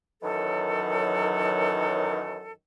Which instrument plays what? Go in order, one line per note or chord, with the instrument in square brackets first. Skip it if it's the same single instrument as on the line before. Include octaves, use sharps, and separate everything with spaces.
[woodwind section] F#2 D#3 E3 F#3 A4